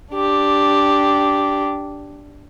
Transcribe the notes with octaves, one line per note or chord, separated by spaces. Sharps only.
D4 G4